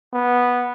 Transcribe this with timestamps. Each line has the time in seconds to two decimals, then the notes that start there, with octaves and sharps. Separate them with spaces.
0.13 B3